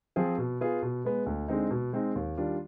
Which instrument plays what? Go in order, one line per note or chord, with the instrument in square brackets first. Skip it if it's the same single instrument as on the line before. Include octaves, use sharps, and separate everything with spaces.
[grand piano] F3 C4 F4 G#4
B2
B3 F4 G#4
B2
G#3 B3
D2
D3 G#3 C4 D#4
B2
G#3 C4 D#4
D#2
D#3 G3 D4 F4